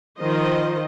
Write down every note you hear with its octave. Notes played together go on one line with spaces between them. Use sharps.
D#3 F3 F4 C5 D#5